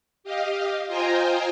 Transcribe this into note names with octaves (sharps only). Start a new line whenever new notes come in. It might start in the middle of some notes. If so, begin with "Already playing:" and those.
G4 D#5 F5
F4 C5 D#5 G5 G#5 A#5